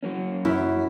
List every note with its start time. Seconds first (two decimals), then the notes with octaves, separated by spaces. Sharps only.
0.03 F#3 A#3 C#4
0.45 F#2 E4